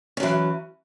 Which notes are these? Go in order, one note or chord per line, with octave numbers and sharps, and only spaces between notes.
E3 F#3 C#4